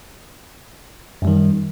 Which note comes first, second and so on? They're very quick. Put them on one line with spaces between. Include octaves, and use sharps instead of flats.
F#2 G3 D#3